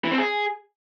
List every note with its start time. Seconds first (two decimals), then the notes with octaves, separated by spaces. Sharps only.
0.05 E3
0.12 C4
0.18 G#4